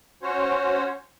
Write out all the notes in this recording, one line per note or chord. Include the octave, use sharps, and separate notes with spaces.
C#4 F#4 C5 C#5